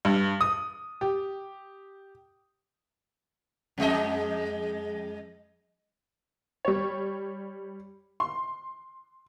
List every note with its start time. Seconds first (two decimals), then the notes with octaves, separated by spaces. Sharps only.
0.05 G2
0.41 D#6
1.01 G4
3.78 F2 G#3 D#5
6.65 G3 C#5
8.20 C6